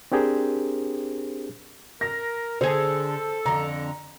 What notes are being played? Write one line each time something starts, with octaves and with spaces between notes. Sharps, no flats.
C4 D4 G4 G#4 A#4 C5
A#4 A#6
D3 G#4 A4 C5
F2 D3 A#5